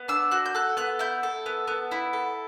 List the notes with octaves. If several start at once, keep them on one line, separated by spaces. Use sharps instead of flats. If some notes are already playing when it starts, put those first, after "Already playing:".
Already playing: B3
D4 E6
F#4 F#6
G6
A4 F#6
B3 F#6
E4 G6
A4
B3
B3
E4
A4